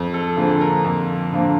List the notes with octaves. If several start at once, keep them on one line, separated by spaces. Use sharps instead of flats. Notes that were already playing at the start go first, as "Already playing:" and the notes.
Already playing: F2
A4
D3 F3 A#3 G#4
A#4
F2
D3 F3 A#3